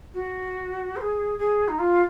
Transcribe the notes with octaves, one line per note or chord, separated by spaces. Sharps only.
F#4
C5
G#4
G#4
D#4
F4